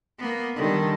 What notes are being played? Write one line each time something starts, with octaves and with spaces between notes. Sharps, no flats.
A#3 B3
D3 D#3 G3